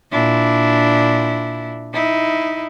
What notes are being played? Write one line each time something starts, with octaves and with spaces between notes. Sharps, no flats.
A#2 D4 E4
D#4 E4